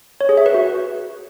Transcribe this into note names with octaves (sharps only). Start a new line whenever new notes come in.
C#5
G#4
E5
B4
F#4